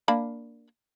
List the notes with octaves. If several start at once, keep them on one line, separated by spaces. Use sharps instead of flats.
A#3 D4 B5